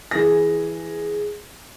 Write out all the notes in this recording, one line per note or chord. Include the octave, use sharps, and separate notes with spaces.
E3 G#4 A#6